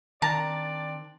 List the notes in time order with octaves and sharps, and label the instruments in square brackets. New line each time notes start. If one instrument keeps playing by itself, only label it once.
[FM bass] D#3 [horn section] C4 D4 D5 [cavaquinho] A5 [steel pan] A#5